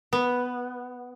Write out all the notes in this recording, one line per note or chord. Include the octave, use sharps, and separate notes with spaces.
B3